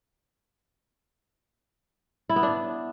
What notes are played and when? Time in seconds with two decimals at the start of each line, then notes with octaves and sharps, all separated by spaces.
2.29 E4
2.36 B3
2.43 D4